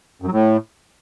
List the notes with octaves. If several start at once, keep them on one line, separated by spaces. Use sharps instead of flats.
F#2
F#3
A2